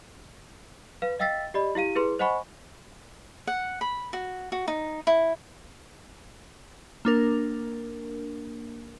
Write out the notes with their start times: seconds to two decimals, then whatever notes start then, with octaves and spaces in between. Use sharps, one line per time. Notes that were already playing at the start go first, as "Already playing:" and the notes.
1.02 B4 F5
1.19 D#5 F5 G5 E6 A6 B6
1.54 G4 D5 D#5 B5
1.75 E4 G4 F5 D#7
1.95 E4 G#4 B4 C6
2.19 C5 D#5 F#5 G#5 B5 C#6
3.47 F#5
3.81 B5
4.13 F#4
4.52 F#4
4.68 D#4
5.07 E4
7.05 A#3 D4 A#4